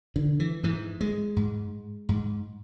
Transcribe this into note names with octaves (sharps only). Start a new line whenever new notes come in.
D3
E3
G#2 E3
G#3
G#2
G#2